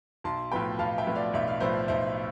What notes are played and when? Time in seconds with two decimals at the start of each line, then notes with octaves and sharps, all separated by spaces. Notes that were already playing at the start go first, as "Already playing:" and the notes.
0.24 B1 A5 C6
0.52 A2 F3 B3 G5 B5
0.79 B1 F5 A5
0.98 E5 G5
1.07 A2 F3 B3
1.15 D5 F5
1.33 B1 E5
1.48 F5
1.60 A2 F3 B3 C5 E5
1.88 B1 C5 E5